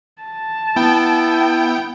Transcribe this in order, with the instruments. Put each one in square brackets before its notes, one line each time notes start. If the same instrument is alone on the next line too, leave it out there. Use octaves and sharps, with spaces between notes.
[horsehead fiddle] A5
[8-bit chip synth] B3 G5 G6 [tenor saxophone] E4